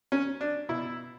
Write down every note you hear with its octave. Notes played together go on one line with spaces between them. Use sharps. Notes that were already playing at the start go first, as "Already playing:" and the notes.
C#4
D4
B2 E4